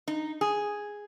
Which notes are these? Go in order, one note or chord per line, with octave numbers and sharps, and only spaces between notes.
D#4
G#4